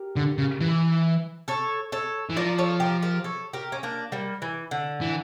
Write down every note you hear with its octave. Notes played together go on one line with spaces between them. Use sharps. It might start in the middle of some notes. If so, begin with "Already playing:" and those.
Already playing: G4 A#4
D3
C#3
E3
A4 C#5
A4 C#5
E3
F3 A#4 D5
A4 C#5
G4 A#4
G4 A#4
A4 C#5
G4 A#4
C#4
A#3 D4
G3 A#3
E3
D3
E3